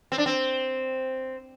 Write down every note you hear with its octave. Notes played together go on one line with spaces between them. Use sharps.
C4
D4
C4